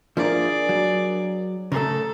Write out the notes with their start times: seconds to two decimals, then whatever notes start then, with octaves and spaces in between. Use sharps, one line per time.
0.17 F3 A#3 D4 E4 G#4 A#4 D5
0.69 F#3
1.72 C#3 A3 A4 A#5